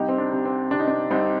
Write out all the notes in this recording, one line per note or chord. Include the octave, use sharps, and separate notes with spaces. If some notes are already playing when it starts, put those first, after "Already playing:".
Already playing: C2 D#4 G4
C4
D4
C3
C4
C3 D4
D#4
D4
C2 C4 D#4